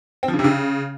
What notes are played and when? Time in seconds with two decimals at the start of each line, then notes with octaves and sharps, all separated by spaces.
0.23 C4
0.28 F3
0.34 C#3
0.39 C3
0.44 C#3